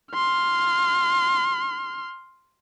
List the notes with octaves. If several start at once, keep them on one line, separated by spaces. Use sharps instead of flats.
C6 F6